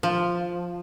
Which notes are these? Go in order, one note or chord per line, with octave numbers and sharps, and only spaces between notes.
F3